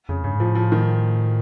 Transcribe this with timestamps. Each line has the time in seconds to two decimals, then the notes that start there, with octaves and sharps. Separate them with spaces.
0.09 F2 C#3
0.24 G2 C#3
0.33 G#2
0.40 A2 F3
0.55 F3
0.72 D#3